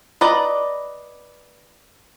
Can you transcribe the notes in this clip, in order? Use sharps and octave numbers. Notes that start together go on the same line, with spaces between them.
B4 D5 D#5 A#5